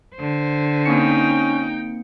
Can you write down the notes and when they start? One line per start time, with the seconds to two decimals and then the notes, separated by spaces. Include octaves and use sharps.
0.16 D3 C5
0.85 A#3 C4 C#4 D#4 G5 C#7